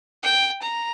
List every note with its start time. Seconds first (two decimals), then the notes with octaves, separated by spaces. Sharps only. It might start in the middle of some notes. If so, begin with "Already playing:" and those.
0.23 G5
0.62 A#5